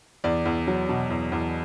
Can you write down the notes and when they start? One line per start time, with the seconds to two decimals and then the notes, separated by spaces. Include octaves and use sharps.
0.24 E2 D5
0.45 E2
0.67 F#3
0.89 B2
1.10 E2
1.32 E2